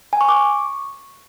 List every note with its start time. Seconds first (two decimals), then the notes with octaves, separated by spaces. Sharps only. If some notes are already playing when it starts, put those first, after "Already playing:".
0.13 G#5
0.21 C#6
0.29 D6
0.36 C#6